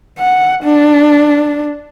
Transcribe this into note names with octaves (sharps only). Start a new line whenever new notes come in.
F#5
D4